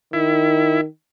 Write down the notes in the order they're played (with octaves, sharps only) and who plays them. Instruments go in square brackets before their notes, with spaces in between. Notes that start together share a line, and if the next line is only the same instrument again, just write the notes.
[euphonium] D#3 [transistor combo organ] E4